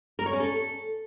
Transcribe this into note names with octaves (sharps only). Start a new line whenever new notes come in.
A#4
C#5
C#4
A4